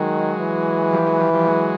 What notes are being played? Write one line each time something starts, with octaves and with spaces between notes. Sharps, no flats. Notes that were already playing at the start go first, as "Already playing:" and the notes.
Already playing: D#3 F#3 G#3
E3
F3 G3
F#3 G#3
F3 G3
F3 G3
F#3 G#3